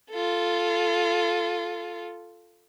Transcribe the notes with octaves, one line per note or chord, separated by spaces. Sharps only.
F4 A4